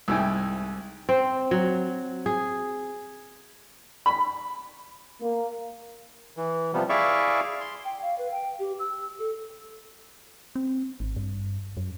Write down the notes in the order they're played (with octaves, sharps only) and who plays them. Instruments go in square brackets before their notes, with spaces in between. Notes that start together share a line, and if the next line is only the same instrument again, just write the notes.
[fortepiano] C2 G#2 E4 G5 G#5
[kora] C4
F#3
G#4
[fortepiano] B5
[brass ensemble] A#3
[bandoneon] E3
C3 F3 G3 B3
E4 G#4 D5 E5 F5 C#6
C6
[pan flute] G5
F5
B4
G5
G4
E6
A4
[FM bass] C4
G#1
G2
F#2